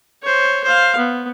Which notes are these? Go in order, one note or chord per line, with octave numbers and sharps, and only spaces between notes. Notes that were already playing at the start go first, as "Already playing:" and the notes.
C5 C#5
C5 F5
B3